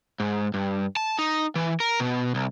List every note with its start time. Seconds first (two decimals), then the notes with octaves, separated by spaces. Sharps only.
0.20 G#2
0.54 G2
0.96 A5
1.19 D#4
1.55 E3
1.80 A#4
2.00 B2
2.35 C2